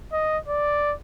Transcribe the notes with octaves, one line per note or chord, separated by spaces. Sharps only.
D#5
D5